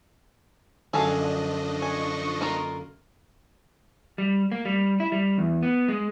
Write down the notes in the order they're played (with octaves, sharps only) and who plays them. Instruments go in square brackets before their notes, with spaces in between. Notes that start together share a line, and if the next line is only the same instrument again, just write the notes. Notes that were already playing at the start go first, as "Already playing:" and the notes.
[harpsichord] F#2 D3 [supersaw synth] F3 D4 D#5 [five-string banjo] G#4 A4 F5
[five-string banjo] G#5 [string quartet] C#6
[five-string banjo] A#3 F4 A#4
[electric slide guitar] G3
A#3
G3
E4
G3
E2
B3
G#3